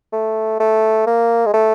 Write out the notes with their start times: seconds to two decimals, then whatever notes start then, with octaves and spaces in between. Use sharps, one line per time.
0.13 A3
0.60 A3
1.07 A#3
1.46 G#3
1.53 A3